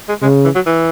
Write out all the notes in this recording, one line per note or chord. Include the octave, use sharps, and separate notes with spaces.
G#3
C#3 G#3
E3
F#3
E3